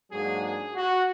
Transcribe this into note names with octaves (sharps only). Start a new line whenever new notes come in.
G#2 F#3 A#3 D4 G#4
G#4
F#4